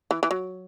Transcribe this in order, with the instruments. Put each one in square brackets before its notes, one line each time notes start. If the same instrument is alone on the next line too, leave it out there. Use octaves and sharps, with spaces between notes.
[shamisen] E3
E3
F#3